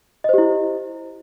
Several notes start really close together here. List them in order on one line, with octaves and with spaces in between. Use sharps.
D#5 C5 G4 E4